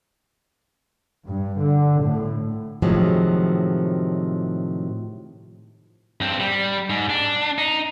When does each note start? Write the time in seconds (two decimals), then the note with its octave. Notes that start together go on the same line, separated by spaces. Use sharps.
1.29 G2
1.62 D3
2.03 A2
2.82 A2 C3 D#3 F3 F#3 G#3
6.21 G2 C4
6.40 G3
6.90 G#2
7.10 D4
7.58 D#4